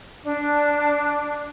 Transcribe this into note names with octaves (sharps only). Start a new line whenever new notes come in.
D4